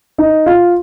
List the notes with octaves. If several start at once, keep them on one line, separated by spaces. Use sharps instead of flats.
D#4 D#5
F4 F5